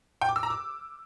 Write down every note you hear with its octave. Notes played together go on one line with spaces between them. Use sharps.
G5
D6
E6
A#5
D6